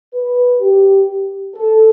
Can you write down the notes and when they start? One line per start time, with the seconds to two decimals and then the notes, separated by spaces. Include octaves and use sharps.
0.14 B4
0.60 G4
1.54 A4